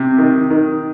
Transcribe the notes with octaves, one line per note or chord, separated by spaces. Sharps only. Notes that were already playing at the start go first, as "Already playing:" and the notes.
Already playing: C3
D#3
D#3